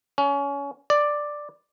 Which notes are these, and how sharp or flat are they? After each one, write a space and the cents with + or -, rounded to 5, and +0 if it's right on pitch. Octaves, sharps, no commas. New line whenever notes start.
C#4 +25
D5 +5